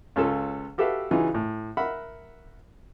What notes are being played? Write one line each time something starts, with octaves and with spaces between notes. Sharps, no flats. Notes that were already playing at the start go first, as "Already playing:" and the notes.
C#2 C#4 F4 A4
F#4 G4 A4 B4 E5 F5
C#3 E3 D#4 F4 F#4 G#4
A2
A#4 E5 F#5 B5